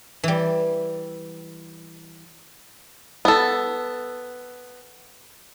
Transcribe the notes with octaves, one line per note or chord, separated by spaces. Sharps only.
E3 G3
B3 A4